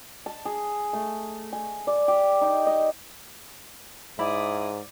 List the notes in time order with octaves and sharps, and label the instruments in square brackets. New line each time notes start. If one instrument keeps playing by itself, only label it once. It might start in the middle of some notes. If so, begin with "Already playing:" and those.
[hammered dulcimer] A5
G#4
A3
G#5
D5
G4
D#4
D#5
[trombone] G#2 [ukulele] E4 B5 [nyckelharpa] D5 D#6